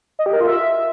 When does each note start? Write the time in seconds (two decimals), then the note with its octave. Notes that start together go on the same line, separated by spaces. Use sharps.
0.19 D#5
0.26 G4
0.33 A#4
0.41 F4
0.48 E5